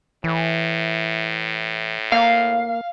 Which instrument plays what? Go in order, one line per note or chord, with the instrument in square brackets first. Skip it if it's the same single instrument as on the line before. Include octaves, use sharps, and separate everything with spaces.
[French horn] A2 [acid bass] E3
[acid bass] A#3 [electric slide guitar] F5